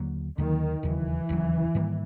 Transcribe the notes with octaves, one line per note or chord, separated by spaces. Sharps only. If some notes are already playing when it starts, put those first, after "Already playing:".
Already playing: D#2 D3 F#3 A#3
D#2 D3 D#3 F#3 A#3
E1 D#2 C#3 E3 F#3
E1 D#2 C#3 F#3
G#2 D#3 G3 A#3